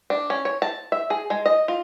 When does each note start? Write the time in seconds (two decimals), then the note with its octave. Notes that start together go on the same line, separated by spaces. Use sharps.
0.10 D4
0.30 C#4
0.45 C#5
0.62 A5
0.92 E5
1.10 G#4
1.30 G#3
1.46 D#5
1.68 F4